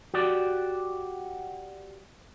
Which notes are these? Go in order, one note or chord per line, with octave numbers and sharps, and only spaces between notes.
F#4 G4 D5